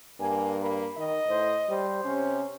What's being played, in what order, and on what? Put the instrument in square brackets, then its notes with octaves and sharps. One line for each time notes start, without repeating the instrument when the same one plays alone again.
[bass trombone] G2 [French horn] A#3 [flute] G#5
[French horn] A#3 [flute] B5
[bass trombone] D#3 [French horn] D#5
[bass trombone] A2 [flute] C5
[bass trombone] G3 [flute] C5
[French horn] C3 [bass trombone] C#4